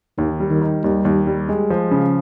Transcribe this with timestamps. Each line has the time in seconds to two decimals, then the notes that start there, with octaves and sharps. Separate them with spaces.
0.18 D#2 D#3
0.40 G3
0.50 D#3
0.61 D#3
0.84 D#2 G3
1.05 D#2
1.27 G3
1.49 G#3
1.70 F3
1.91 C#3